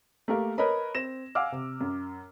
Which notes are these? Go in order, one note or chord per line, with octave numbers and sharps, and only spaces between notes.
A3 A#3 G4 A#4 F5
A#4 B4 C#5 D#5 B5
C4 A#6 E7
F5 F#5 G#5 D6 E6 F6
C3
F#2